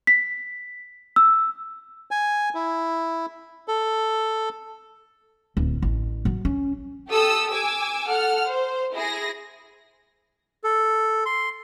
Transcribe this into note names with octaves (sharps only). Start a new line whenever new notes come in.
B6
E6
G#5
E4
A4
D1
A1
F#3
C#4
G4 A4 D#6 E6
G#5 D6 E6
A4 F#5 F6
C5
E4 G#4 A#6
A4
C6